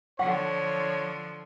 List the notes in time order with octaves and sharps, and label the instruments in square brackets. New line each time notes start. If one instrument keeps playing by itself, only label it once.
[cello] D3 F3 [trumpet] C#5 [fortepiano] F#5 C#6